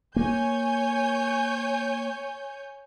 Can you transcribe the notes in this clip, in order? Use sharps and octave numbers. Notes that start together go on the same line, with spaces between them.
A#3 C#5 G#5 G6